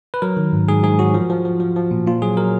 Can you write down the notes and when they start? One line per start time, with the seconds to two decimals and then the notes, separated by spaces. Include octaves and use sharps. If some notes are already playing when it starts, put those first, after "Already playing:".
0.14 B4
0.22 F#3 A#4
0.37 D#3
0.53 G#2
0.68 G#2 G#4
0.84 G#2 G#4
0.99 F#3 F#4
1.14 F3
1.30 F3
1.45 F3
1.60 F3
1.76 F3
1.91 A#2
2.07 A#2 F4
2.22 F#3 G#4
2.37 F#3 A#4